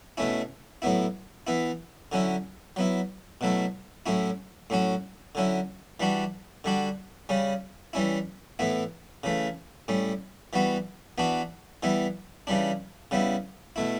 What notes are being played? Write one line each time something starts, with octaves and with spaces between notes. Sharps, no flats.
B2 A3 C#4 E4
A2 F#3 B3 E4
E3 B3 E4
D3 F#3 C#4 E4
F#3 B3 E4
B2 F#3 A3 E4
A2 F#3 C#4 E4
A2 F#3 C#4 F#4
D3 F#3 C#4 E4
E3 G3 D4 F#4
D3 G3 D4 F#4
C#3 G3 C#4
E3 G3 C#4 E4
A2 E3 B3 E4
C#3 E3 A3
A2 G3 C#4
E3 G3 B3 F#4
E3 B3 D4 F#4
E3 G3 B3 E4
C#3 E3 G3 D4
C#3 G3 B3 E4
B2 A3 E4